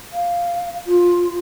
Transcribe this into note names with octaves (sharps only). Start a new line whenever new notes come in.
F5
F4